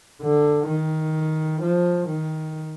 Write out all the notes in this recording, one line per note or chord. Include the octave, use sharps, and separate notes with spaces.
D3
D#3
F3
D#3